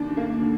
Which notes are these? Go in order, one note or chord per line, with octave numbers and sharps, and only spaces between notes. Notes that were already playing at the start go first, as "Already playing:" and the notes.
Already playing: D#2 D#3 D4
A#3
D3